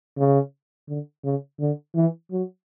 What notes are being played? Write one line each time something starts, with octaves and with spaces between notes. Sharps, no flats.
C#3
D3
C#3
D3
E3
F#3